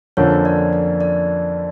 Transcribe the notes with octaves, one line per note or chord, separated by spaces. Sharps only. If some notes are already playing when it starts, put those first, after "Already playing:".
F2 D3 F3 A#3 C#4 C#5
D5
D5
D5